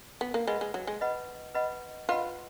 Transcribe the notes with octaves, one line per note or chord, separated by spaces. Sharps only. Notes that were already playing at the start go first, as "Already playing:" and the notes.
B3
A#3
G#3 B4 D#5 F#5 B5
G#3
F#3
G#3
B4 D#5 F#5 B5
B4 D#5 F#5 B5
F4 B4 D#5 F#5 B5